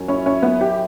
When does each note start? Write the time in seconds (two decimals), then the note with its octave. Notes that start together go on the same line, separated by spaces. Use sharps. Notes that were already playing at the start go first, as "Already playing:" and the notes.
Already playing: F#2
0.08 C#4 E4
0.26 C#4 E4
0.43 F#2 B3
0.61 E4 G4